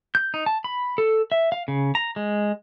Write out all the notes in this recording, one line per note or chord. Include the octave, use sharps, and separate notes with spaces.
G6
D#4
A5
B5
A4
E5
F5
C#3
A#5
G#3